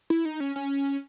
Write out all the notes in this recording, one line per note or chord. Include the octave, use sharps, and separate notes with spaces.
E4
D#4
C#4
C#4